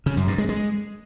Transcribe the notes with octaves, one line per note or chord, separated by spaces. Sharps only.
C#3
F#2
G2
G#3
G#3